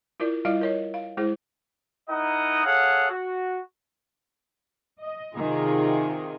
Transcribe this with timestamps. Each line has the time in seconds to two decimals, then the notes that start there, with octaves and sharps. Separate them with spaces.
0.20 E4 F4 A#4 D5
0.45 G3 E4 F4 D5 D#5 F5
0.61 A#4 C#5 D#5
0.94 F5
1.17 G#3 E4 G#4 C5
2.09 D#4 E4 A#4 D#5 F#5 D#6
2.65 G#4 A4 C#5 F5 F#5
3.10 F#4
5.01 D#5
5.37 C3 D#3 F4 G#4